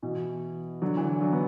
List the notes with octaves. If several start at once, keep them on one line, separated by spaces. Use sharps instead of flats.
B2 E3
D3 F#3
E3
D3
D3 F#3
B3